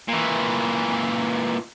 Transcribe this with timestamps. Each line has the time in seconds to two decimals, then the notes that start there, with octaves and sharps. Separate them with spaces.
0.08 A#2 E3